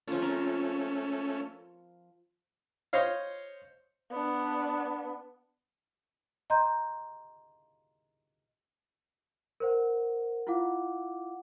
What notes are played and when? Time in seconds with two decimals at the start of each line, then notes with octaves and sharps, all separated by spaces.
0.08 F3 A3 C#4 F4
0.22 C4 A#4
2.93 C5 C#5 D#5 F5
4.11 B3 D4
6.50 D#5 A#5 C6 G6
9.60 A#4 C5 F#5
10.47 E4 F4 F5 F#5 D6